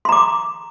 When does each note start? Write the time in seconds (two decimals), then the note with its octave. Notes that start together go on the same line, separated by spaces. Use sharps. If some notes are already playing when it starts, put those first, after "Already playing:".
0.05 C6
0.09 A#5
0.12 D6